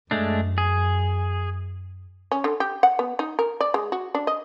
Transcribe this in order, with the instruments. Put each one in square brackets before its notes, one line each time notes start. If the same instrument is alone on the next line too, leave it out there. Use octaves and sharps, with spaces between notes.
[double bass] F#2 [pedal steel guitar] G#3 A3 D4
[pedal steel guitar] G#4
[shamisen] C#4
D3
G4
F#5
B3
D#4
A#4
D5
G#3
F#4
D4
D#5